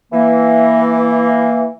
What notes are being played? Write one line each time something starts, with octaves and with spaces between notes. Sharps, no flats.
E3 A#3